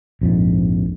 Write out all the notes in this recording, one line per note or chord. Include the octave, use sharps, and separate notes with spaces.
A#1 F2 G#2